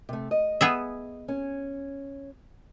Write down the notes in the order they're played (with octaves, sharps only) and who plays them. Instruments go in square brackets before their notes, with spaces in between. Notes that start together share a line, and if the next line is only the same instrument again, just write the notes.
[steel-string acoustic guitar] C3 A3
D#5
[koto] B3 G#4 E5
[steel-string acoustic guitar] C#4